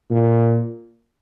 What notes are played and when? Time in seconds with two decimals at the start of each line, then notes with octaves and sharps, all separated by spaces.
0.11 A#2